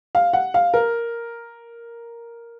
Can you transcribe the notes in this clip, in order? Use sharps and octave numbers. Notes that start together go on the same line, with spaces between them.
F5
F#5
F5
A#4